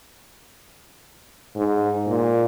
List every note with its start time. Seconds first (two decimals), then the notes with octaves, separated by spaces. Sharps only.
1.56 G#2
2.07 A#2